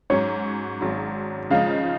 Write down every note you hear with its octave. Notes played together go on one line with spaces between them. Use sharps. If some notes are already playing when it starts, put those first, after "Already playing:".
G#2 F#3 C#4 C#5
G#1 G#2 F#3
C#3 F3 G#3 D#4 F5